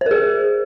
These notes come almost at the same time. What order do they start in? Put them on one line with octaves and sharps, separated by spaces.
C5 A#4 G#4